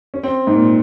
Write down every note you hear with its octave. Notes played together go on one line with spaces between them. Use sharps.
C#4
C4
G#2
A#2